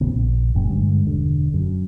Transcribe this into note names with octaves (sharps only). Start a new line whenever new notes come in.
D#1 A1 C#3 B3
A#1
F#1 F#2 A#2 C#4
G2 D3 G#3
E1 D3
F#2